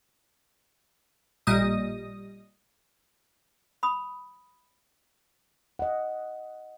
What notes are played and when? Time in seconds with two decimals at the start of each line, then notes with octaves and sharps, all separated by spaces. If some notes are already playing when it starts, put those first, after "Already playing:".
1.47 A1 A#2 G3 D#5 D#6
3.83 B5 D#6
5.79 D#5 F#5